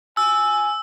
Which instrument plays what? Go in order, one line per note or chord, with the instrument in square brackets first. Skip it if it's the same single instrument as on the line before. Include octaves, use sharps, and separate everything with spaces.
[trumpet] G#5 [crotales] E6